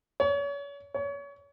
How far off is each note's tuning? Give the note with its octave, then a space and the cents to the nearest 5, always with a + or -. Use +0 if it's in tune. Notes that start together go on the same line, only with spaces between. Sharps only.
C#5 +35
C#5 +30